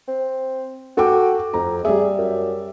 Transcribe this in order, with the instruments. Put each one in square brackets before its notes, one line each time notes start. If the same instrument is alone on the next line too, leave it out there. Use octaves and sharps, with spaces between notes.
[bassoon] C4
[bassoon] F#4 [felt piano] A4 G5 D6
[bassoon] F2 [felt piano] A#5
[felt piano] G3 D5 E5 [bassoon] G#4
[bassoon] F#2